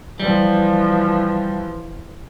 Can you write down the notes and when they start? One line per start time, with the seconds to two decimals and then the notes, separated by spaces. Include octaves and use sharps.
0.20 E3 F3 G3